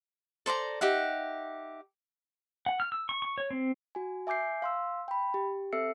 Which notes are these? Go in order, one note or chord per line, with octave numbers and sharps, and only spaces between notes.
A4 C5 D5 A#5
D#4 G4 E5 F#5
F#5
F6
E6
C#6
C#6
C#5
C4
F#4 G#5
E5 G#5 D6 G6 C7
F5 C6 E6
G5 B5
G4
C4 A4 E5 E6 C7 C#7